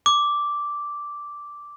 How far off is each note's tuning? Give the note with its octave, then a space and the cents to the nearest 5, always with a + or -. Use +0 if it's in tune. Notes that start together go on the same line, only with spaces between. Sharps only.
D6 -5